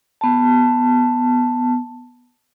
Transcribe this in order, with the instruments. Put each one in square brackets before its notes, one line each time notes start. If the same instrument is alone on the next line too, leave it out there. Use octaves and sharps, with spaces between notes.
[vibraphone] B3 A5